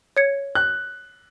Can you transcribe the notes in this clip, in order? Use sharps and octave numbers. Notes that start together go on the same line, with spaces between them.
C#5 G#6 C#7
F#6